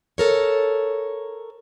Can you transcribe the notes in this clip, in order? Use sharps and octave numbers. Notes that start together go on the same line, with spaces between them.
A4 A#4 C#5